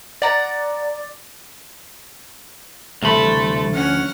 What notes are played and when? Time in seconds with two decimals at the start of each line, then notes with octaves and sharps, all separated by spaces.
0.22 D5 F#5 A#5
3.03 D2 C3 E3 G3 A3 B5 C6
3.74 F3 C#4 F#5 F6